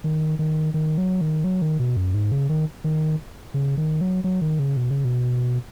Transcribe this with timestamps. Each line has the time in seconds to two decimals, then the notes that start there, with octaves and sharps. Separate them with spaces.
0.04 D#3
0.39 D#3
0.74 D#3
0.98 F#3
1.21 D#3
1.44 F#3
1.62 D#3
1.80 B2
1.97 F#2
2.14 G#2
2.32 C#3
2.49 D#3
2.84 D#3
3.54 C#3
3.77 D#3
4.01 F#3
4.24 F#3
4.42 D#3
4.59 C#3
4.77 B2
4.91 C#3
5.05 B2